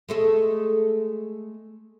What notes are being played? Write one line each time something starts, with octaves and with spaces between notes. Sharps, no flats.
G#3 A3 A4